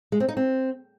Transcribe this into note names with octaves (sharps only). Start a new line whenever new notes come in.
G#3
C4
D#4
C4